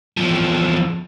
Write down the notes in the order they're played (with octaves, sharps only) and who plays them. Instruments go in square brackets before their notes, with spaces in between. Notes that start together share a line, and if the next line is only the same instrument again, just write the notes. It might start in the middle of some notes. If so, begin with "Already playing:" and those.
[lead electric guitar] E2 F3